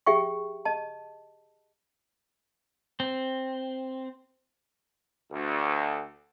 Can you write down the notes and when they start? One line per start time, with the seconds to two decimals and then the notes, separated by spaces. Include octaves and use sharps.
0.06 G4 G#4 E5 G5 C#6
0.65 D#5 A5
3.00 C4
5.31 D2